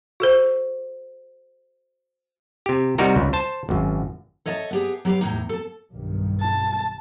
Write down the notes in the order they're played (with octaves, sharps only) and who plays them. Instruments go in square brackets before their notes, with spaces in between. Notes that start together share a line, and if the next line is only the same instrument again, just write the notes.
[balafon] F#4 A4 C5
[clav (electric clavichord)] C3 G4
C3 G3 D#4 F#4 A#4 A#5
C#2
C5 A5
G#1 F#2
[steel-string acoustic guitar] A4 C#5 D#5 E5 G#5 A5
B3 G4 G#4
F#3 G4 B4 F5
E2 A2 G#3 D#4
A4 A5
[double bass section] B1 G2 D#3
[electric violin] A5